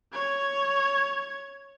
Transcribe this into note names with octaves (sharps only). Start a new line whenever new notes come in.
C#5 G#6